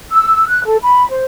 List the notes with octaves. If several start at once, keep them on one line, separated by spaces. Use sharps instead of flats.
E6
F#6
A4
B5
C5